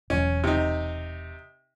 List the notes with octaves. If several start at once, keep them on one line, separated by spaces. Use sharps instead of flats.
E1 E2 F#3 C#4
C3 D#4